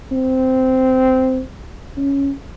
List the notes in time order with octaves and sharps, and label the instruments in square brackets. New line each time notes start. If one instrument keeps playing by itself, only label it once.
[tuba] C4
C#4